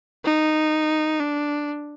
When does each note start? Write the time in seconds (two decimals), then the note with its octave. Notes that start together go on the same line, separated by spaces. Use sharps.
0.24 D#4
1.20 D4